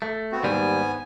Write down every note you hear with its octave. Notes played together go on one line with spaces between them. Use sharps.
A3
B3 C4 F#4
D#2 G#2 G3 B3 G#5